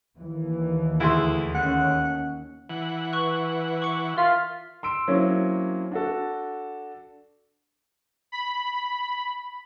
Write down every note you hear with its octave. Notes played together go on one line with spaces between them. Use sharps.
D#2 E3
D2 E4 G#4 C6
D#2 C#4 F#5
E3 F#5
B4 C#6 F#6
C#6 D6 C#7
F4 A#4 E5 C6 B6
C6 E6 D7
F#3 A#3 C4 C#4 E4
D4 F#4 A4
B5